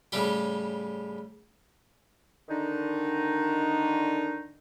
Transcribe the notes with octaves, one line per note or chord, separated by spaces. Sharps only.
A2 C#3 G3 G4
D3 D#3 D4 D#4